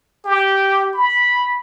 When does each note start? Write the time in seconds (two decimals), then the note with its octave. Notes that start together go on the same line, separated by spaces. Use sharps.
0.25 G4
0.94 B5